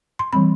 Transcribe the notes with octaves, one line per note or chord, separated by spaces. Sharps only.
C6
E3 G3 C4 B5